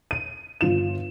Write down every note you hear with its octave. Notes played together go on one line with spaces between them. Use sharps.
D#7
G1 F4 E7